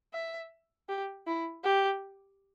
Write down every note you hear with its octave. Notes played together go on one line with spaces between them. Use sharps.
E5
G4
E4
G4